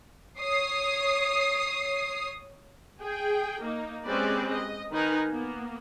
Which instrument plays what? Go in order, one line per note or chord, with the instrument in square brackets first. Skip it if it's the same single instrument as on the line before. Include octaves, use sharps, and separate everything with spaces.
[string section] C#5 D#6 C7
[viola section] G#4 G5
A#3 D#4
G#3 C4 C#4 G4 B4 D5
D#5
D#3 D#4 A#4 B4 G#5
A#3 B3